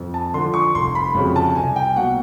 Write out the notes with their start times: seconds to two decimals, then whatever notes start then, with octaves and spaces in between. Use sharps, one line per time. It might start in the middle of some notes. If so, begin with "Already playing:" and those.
Already playing: F2
0.14 A5
0.34 D3 F3 C6
0.54 C#6
0.75 F1 C6
0.95 B5
1.14 F2 C#3 F#3
1.36 A5
1.55 C2 G#5
1.76 G5
1.96 B2 F#3 A#3 F#5